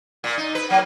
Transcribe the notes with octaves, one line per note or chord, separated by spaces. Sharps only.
A#2
D#4
B4
F#3 A#3